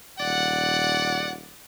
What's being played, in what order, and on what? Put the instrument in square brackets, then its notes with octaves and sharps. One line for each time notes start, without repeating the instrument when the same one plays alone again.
[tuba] D#1 [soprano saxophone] D5 [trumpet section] F#5